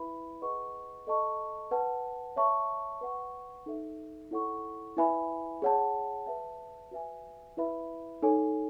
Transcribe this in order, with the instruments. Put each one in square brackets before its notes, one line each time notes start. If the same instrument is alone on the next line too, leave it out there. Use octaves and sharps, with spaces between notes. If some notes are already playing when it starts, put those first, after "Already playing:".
Already playing: [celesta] E4 B4 E5 B5
G#4 B4 D#5 F#5 C#6
A4 D#5 A5 C#6
B4 F#5 A5
C#5 E5 A5 C#6
B4 F#5 C#6
D#4 A4 E5
E4 A4 C#5 F#5 C#6
E4 B4 E5 G#5 B5
G#4 C#5 F#5 A5
B4 E5 A5
F#4 B4 E5 G#5
E4 B4 E5 B5
D#4 A4 C#5 G#5